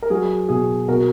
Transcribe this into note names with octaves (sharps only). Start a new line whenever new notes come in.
A#4
F#3 G#4
B2 G#4
B2 F#4 A#4